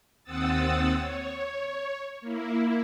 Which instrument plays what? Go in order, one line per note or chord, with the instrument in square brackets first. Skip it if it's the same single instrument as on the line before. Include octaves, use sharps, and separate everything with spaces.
[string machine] D#2 C4 F#5 D#6 E6 A6
C#5
A#3 E4